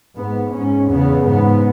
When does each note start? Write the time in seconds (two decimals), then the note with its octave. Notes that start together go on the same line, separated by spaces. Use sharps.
0.16 G#2 B3
0.53 G#2 C#4
0.89 E2 C#3 B3
1.26 G#2 B3